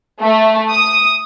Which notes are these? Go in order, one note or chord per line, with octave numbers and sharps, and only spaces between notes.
A3
D#6